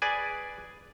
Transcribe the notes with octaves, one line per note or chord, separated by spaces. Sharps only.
G#4 B4 D5 G#5